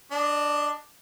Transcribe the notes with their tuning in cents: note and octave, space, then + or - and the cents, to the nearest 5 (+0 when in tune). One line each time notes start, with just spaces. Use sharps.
D4 +0 D#5 -35